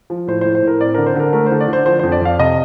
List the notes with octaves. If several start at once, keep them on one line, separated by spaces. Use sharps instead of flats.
F3
A2 C5
A2 C5
C5
A2 A#4
C4 D5
D3 A#4
C5
D3 A#4
A3 A#4
C5
D3
D5
D3 C5
F3 C5
F2 C5
D5
F2 F5
C3 D#5